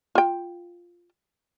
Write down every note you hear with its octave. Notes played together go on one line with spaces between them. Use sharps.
F4 G5